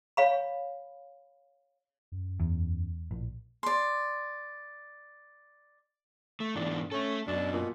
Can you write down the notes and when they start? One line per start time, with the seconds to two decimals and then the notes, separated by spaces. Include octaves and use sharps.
0.17 C#5 F5 B5
2.12 F#2
2.40 E2
3.11 A#1 A2
3.63 D5 C6
6.40 A3
6.55 G#2 B2 E3 D4
6.92 A3 C#4 A4
7.28 F#2 B2 D4
7.53 A#2